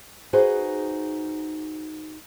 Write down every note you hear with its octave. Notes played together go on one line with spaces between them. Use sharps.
D#4 F#4 G#4 B4 C5